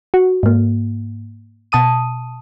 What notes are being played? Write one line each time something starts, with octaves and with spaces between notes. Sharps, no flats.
F#4
G#2 A#3
B2 A5 D#6 D#7